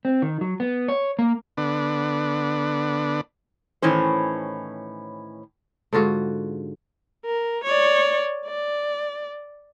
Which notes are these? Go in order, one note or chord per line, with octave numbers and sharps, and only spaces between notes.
C4
D#3
F#3
B3
C#5
A#3
D3 B3 D4
A2 D#3 E3 C#4 C5
G#2 D3 F4 F#4
A#4
C#5 D5
D5